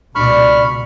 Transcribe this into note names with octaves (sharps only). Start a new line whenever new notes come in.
C#2 B2 D4 D5 B5 C#6 F6